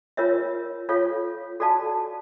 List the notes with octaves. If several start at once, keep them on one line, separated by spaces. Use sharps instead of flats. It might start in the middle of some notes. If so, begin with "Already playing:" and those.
F4 A#4 C#5 E5
F4 A4 C#5 F5
F#4 A4 D5 F5 A5